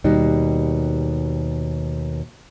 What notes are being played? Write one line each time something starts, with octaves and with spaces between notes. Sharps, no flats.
D#2 B2 G3 D#4